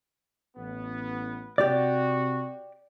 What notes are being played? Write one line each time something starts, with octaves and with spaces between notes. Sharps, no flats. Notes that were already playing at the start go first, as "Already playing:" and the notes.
A1 B3
C3 F#4 G4 D5